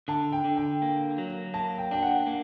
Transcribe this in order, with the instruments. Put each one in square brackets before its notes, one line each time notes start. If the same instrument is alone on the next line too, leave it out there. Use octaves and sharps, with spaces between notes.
[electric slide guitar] D3 [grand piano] A5
[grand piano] G5
[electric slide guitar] D3
[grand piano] G5
[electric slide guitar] A#3
F#3
[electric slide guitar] A#3 [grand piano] A5
[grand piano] G5
[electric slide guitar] D4 [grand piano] G5
[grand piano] F#5
[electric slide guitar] A#3